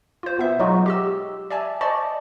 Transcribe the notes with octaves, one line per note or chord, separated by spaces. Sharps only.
F4 C5
B2 B3 E5
F#3 G#3 D#4 F4 F#4
G4 D#5 E6
D5 E5 G#5 A5
C5 D5 D#5 A5 C#6